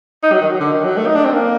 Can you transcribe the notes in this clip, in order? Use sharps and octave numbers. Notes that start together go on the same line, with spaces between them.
D#4
F#3
D#3
F#3
D3
D#3
F#3
A3
D#4
D4
C4
A#3